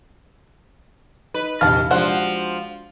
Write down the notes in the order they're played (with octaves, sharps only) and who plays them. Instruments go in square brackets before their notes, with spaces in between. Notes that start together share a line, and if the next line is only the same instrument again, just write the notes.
[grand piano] D#4 [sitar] B4
[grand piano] A#1 E2 C3 [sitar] D#3 [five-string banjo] F5 A5
[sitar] F3 C5 [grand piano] G#3 D4 G4 [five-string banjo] F#4 F#5